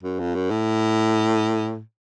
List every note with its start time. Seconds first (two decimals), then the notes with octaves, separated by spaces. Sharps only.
0.03 F#2
0.19 F2
0.35 F#2
0.50 A2